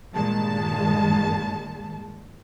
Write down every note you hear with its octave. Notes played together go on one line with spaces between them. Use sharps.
G2 A#2 D#3 G#3 A5